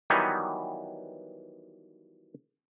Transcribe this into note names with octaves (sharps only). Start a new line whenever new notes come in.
D#3 E3 F#3 G3 B3 D#4